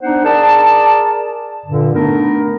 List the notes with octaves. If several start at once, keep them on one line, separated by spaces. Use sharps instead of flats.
B3 D4 D#4 C5 F#5
G#4 A#4 D5 A5
G2 A#2 D3
A3 B3 D4 D#4 A#4